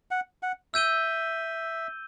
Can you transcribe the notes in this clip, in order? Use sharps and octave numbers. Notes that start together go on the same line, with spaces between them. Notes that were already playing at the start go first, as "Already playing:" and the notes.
F#5
F#5
E5 E6 G6 D#7 G7